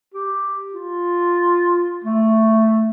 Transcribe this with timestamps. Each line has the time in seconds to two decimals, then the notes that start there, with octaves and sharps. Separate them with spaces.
0.14 G4
0.74 F4
2.05 A3